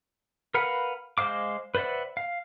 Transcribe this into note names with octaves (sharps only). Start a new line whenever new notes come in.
A#4 B4 F5 F#5
G#3 C5 C#5 F5 D6
B4 C5 D5 E5 F#5
F5